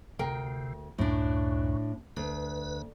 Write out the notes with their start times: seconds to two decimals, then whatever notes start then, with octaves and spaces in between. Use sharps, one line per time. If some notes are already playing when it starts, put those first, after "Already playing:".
0.19 D2 C3 A#4 G5
0.98 C#2 F#2 A2 D4
2.17 D2 B4